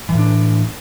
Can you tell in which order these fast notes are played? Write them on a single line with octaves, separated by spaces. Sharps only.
E3 A2 D4